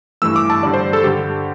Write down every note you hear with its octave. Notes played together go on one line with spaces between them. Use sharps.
G2 E3 A3 E6
D6
A5
G2 D3 G3 D5
C5
A4
G2 D3 G3 G4